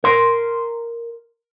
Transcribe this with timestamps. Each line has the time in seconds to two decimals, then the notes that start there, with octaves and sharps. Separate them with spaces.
0.04 A#4 C6